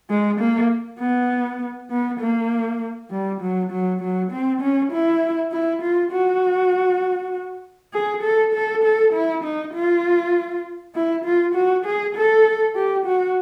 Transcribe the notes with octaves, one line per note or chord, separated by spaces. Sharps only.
G#3
A#3
B3
B3
A#3
G3
F#3
F#3
F#3
C4
C#4
E4
E4
F4
F#4
G#4
A4
A4
A4
E4
D#4
F4
E4
F4
F#4
G#4
A4
G4
F#4